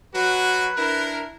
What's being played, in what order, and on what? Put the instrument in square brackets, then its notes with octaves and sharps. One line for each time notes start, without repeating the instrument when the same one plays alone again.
[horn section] F#3 F#4 [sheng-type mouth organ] B4
[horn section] D4 E4 A#4